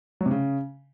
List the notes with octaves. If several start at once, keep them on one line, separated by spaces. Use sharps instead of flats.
F#3
C3
C#3